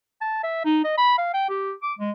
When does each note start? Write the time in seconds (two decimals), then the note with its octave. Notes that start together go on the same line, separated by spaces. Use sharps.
0.21 A5
0.43 E5
0.65 D#4
0.84 D#5
0.98 B5
1.18 F5
1.34 G5
1.49 G4
1.83 D6
1.99 G#3